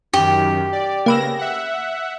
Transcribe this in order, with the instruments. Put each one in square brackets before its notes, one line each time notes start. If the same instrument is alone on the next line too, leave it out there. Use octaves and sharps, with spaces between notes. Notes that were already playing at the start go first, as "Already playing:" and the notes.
[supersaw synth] F#2 D#3 [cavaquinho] G4
[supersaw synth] D5
[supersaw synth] C#3 A#6 [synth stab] A#3 B4 E6
[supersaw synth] E5 F#5